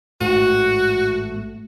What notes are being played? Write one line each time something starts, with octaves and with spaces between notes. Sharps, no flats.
A1 G#2 A3 F#4